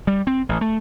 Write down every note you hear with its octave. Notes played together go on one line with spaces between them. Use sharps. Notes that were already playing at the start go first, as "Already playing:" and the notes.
G3
C4
A1
A3